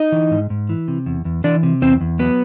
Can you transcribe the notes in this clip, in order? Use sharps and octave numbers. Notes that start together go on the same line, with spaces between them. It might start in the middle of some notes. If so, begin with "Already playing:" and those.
Already playing: D#4 D#5
E3
G#2
G#2
E3
C3
E2
E2
E3 D4 D5
C3
E2 C4 C5
E2
F#3 B3 B4